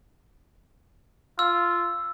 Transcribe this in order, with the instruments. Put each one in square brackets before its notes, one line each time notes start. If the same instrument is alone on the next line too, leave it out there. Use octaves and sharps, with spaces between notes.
[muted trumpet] F4 [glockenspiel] E6